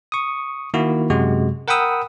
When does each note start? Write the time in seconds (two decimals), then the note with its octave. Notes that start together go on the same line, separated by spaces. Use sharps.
0.12 C#6 D#6
0.74 D#3 A#3 E4 F#4
1.10 F#2 C3 G#3 F#4
1.68 A#4 F#5 G5 B5 D#6 E6